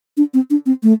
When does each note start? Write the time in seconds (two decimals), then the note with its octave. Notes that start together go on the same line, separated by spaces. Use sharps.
0.17 D4
0.34 C4
0.50 D4
0.66 C4
0.83 A3